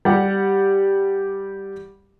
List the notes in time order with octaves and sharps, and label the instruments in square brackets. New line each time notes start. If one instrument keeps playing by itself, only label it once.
[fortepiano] G3 G4 F#5